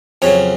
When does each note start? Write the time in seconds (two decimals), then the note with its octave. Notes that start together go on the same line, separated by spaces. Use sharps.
0.22 F2 C#3 F#3 C#5